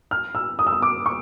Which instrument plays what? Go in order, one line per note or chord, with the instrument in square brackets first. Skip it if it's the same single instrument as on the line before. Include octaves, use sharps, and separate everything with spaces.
[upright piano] F6
E6
D#6
E6
D#6
D6
C#6